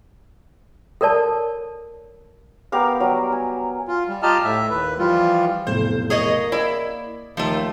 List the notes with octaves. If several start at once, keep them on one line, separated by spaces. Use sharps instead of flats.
A4 A#4 C#5 D5 A5
B3 G4 A#4 F5
F#3 G3
G#5
F4
G3
F4 G4 D#5 A5 A#5 F6
A2 E5
D#2 B4
E3 F3 G3 F4
F1 B1 A2 C5
A#3 G#4 C#5 D#5
E4 D5 D#5
D#2 F3 A3